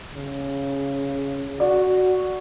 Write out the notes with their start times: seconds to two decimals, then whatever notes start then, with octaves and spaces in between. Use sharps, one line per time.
0.14 C#3
1.60 F#4 D5